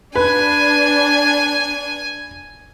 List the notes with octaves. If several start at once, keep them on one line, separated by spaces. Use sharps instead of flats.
D4 B4 G#5